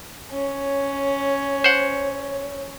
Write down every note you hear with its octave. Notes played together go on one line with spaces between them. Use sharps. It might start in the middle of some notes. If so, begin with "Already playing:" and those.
C#4 C#5
C5 F#5